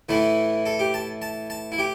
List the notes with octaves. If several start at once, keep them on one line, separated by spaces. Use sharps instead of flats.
A2 E3 A3 E4
A4
G4
A5
A5
A5
E4
G4